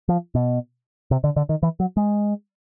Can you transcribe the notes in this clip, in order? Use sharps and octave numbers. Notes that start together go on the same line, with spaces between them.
F3
B2
C3
D3
D3
D#3
E3
F#3
G#3